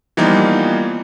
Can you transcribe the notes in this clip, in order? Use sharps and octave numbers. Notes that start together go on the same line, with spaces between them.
E3 F3 G3 A#3 B3 D#4